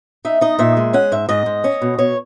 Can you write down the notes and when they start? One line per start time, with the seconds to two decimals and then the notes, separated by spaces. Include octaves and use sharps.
0.25 D#4 E5
0.41 D#4 D#5
0.59 A#2 E5
0.77 G#3
0.93 C#4 F#5
1.12 G#2 E5
1.29 G#2 D#5
1.46 G#2
1.64 C#4
1.82 B2
1.98 B2 C#5